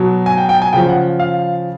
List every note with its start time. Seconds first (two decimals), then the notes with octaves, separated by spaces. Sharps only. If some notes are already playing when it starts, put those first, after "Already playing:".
Already playing: B2 F#3
0.26 G#5
0.38 G5
0.49 G5
0.62 G#5
0.73 C#3 F3 G5
0.89 F#5
1.20 F5